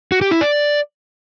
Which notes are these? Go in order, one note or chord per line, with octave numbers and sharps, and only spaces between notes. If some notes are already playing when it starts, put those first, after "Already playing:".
F#4
G4
E4
D5